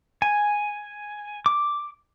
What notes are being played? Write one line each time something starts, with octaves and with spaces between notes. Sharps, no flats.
G#5
D6